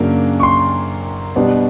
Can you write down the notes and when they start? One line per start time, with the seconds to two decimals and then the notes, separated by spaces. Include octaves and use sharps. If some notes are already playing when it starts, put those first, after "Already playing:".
Already playing: F#2 C#3 F#3 A#3 D4
0.40 C#6
0.43 C6
1.36 B2 G3 B3 D4